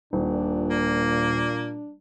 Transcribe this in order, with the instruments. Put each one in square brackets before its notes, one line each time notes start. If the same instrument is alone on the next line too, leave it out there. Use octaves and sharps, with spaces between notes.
[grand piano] D#1 [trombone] A#2 [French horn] D4
[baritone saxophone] A#3